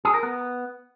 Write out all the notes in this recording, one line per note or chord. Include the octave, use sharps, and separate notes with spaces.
G#4
A#4
B3